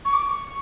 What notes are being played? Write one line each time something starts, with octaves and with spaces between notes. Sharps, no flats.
C#6
D6
C#6